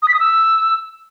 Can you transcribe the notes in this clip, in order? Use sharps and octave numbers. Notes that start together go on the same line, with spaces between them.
D#6
B6
D#6
E6